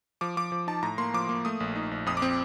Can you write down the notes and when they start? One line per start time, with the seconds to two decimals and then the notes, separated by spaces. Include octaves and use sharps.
0.21 F3 D6
0.37 F3 D6
0.52 F3
0.67 D#4 A5
0.83 A2 A#5
0.98 A#3 C6
1.14 F3 D6
1.29 A#3
1.45 A3 D#6
1.60 A#1
1.76 D#4
1.91 A#1
2.06 F2 D#6
2.17 D6
2.22 C4